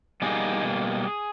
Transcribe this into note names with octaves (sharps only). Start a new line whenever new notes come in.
B2 G3 A#3 D#4 G#4
B2 G3 A#3